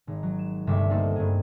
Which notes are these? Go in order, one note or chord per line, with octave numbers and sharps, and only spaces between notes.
G#1
F#3
E7
G1 C2 G2 A3 E5 D6
A#3 C4 D#4 A4 C5
G2 G#4